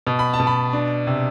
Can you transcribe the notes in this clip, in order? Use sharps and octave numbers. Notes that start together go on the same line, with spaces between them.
B2
B5
A5
B2
B5
D4
C3